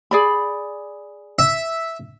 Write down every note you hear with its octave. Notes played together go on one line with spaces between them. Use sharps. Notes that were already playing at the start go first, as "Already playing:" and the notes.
G#4 D5 B5
E5